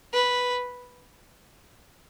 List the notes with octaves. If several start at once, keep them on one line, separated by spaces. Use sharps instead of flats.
B4